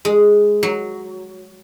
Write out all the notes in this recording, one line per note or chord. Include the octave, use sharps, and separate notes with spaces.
G#3
F#3